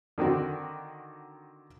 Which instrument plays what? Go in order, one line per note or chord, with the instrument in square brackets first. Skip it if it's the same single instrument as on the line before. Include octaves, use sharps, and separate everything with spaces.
[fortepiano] D3 D#3 C4 F#4